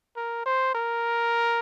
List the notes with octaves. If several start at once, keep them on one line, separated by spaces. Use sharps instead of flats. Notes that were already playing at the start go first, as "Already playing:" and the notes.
A#4
C5
A#4